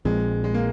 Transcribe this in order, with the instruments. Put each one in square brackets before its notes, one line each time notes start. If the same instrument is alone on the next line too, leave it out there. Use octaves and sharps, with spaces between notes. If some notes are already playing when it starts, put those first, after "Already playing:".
[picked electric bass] A#1 A#2 F3 C4 [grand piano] G#3
[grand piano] G#3
A#3